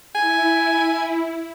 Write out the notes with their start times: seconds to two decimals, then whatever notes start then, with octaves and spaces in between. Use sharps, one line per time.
0.15 E4 G#5